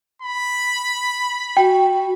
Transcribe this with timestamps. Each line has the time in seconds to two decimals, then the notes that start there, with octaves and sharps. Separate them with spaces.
0.22 B5
1.57 F#4 G5